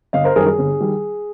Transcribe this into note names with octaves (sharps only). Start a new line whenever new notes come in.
G1 D#5 F5
A#4 C5
F#2 D#3 G3 G#4 A#4
G#4
G1
D#3 G3